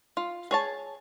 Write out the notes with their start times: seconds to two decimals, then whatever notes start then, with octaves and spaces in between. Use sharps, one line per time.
0.17 F4
0.51 G#4 C#5 A5